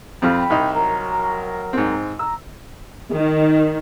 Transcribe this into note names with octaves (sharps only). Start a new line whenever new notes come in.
F2 C4 F4 G5 B5
C2 D#4
F#3 A#4 A#5
G#2 C4
A#5 E6
D#3